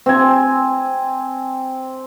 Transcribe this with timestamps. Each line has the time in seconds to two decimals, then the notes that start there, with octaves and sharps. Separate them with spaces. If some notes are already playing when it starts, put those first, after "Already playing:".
0.06 C4 G#5